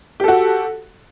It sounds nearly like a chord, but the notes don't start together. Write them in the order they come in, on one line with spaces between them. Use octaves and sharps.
G4 A4 F#4